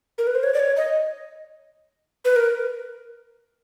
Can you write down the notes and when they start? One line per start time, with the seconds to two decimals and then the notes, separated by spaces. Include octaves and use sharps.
0.18 A#4
0.27 B4
0.35 C5
0.43 C#5
0.54 D5
0.59 C#5
0.77 D#5
2.25 B4
2.36 A#4